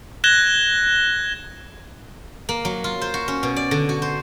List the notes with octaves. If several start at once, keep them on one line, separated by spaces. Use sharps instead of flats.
F#6 G#6 A#6 E7 G7
A#3
F#3
F4
C5
F#4
C#4
B2
D5
D3
F#4
C5